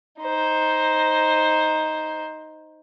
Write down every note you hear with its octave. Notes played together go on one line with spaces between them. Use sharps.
D#4 C5